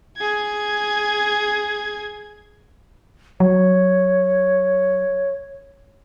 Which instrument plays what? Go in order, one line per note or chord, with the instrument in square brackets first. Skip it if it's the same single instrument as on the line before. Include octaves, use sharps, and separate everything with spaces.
[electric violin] G#4 G#6
[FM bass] F#3 [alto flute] C#5